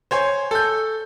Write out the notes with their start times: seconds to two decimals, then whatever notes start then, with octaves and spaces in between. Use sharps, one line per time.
0.11 C5 C#5 G#5
0.51 A4 G6